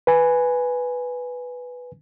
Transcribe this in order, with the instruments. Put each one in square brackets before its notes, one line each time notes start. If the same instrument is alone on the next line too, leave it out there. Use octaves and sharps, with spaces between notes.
[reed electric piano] B4 G#5